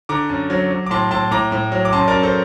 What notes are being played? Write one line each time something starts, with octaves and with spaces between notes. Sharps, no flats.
D3 A#5 D6
F#2
F#3
F#3
D6
A2 A5 C6
A2 A5 C6
A2 A#5 D6
A2
F#3
D6
F#2 A5 C6
A#4 D5
F#2
A4 C5